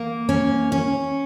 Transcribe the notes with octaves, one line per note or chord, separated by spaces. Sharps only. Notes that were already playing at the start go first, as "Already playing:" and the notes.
Already playing: A#3
C#4
C#4